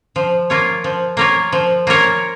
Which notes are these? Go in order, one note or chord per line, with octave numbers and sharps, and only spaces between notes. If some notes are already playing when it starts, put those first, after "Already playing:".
F3
A#3 F4 A#4 C#5
F3
A#3 F4 A#4 C#5
F3
A#3 F4 A#4 C#5